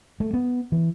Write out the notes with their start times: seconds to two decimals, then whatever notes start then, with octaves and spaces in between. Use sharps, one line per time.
0.20 A3
0.34 B3
0.72 E3